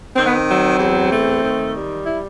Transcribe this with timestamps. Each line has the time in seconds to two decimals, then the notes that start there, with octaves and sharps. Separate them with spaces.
0.16 D#3 C4
0.25 B3
0.34 C4
0.48 F#3
0.79 E2
1.11 A3
1.42 D#3
1.74 G3
2.05 E4